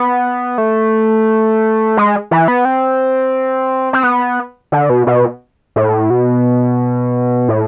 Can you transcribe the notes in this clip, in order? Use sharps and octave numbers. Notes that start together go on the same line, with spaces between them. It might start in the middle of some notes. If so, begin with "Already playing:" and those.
Already playing: B3
A3
G#3
E3
B3
C4
C4
B3
D3
B2
B2
A2
B2
A2